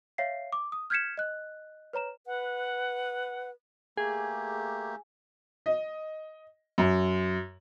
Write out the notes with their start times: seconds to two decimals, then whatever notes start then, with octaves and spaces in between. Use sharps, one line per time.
0.18 C#5 E5 F5 C7
0.52 D6
0.72 D#6
0.90 F6 G6 G#6 B6 C#7 E7
1.18 D#5 F#6
1.93 B4 C#5 A#5 E7
2.27 B4 F#5
3.97 A3 A#3 G4 G#4 G#5
5.66 D#5
6.78 F#2